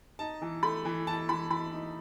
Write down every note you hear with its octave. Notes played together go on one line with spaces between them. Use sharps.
D#4 A5
E3
A3 B5
E3
E3 A5
E3 B5
E3 B5
D#4